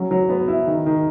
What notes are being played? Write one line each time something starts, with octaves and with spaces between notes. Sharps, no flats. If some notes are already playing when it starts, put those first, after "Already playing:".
Already playing: F#3 C#4
F#3
B3
E4
D#3
D#3